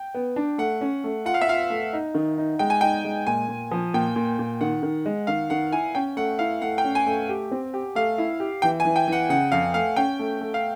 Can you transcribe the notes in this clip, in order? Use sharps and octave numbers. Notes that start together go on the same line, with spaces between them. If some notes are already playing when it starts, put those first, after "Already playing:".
Already playing: G5
B3
D4
A3 F#5
C#4
A3
F4 F#5
F5
E5
F4 F5
A3
D#4
D#3
D#4
G#3 G5
G#5
D#4 G5
G#3
A#2 G#5
A#2
F3
A#2 G5
A#2
A#2
D#3 F#5
D#3
G#3
D#3 F5
D#3 F#5
E4 G#5
C#4 G5
A3 F#5
E4 F5
A3 F#5
G5
C#4
G#5
A3
G4
C4
G4
A3 F5
E4
G4
E3 G5
G#5
E3
G5
E3 F#5
C#3 F#5
F2 F5
A3 F5
C#4 G5
A3
A3
F5